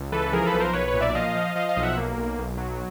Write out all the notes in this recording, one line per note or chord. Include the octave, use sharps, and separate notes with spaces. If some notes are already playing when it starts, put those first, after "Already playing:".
Already playing: C#2
E3 A4 B4
F3 G#4 A#4
A4 B4
B1
A#4 C5
B1 B4 C#5
B4 C#5
A#2
D5 E5
F3 D#5 F5
F3
F3 D#5 F5
D#5 F5
B1
E5 F#5
A#3
B1
B1
F#3